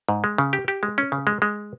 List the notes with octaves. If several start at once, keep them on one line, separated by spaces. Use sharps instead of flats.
G#2
G#3
C#3
G4
G4
G#3
C#4
C#3
G#3
G#3